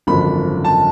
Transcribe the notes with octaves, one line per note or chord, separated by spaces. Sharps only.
G#1 F#2 D3 F3 A#3 B5
A5